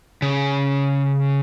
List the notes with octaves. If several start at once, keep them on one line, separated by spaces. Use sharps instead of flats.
C#3